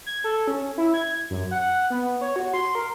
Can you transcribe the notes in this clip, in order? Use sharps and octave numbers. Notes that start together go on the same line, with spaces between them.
G#6
A4
C#4
E4
G#6
F#2
F#5
B3
C#5
F#4
C6
A#4